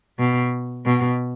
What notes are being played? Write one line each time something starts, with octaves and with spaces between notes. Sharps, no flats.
B2
B2